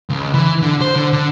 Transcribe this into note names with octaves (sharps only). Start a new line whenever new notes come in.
C#2
E3
D3
C5
D3
D3